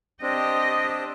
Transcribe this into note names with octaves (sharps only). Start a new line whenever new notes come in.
C4 D4 G4 D#5